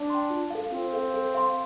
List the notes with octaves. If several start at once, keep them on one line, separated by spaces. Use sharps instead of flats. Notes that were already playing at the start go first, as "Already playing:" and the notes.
Already playing: D4
G5 C6
F4
A4 F5
C4 F4
A4 F5
A4
F5 C6